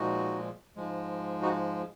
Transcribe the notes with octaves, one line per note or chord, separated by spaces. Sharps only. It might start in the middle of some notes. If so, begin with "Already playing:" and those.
Already playing: A#2 F3 G#3 D#4 F#4
G#2 F3 G#3
D#4 F#4